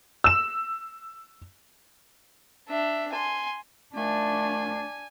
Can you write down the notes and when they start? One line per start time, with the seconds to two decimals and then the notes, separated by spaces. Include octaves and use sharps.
0.24 E6 E7
2.69 D4 E5
3.13 G#5 C6
3.95 D#3 F3 A3 D4 G#5